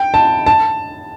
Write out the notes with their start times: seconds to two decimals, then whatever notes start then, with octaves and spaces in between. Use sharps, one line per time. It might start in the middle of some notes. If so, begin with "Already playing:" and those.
Already playing: G5
0.14 A5
0.46 A5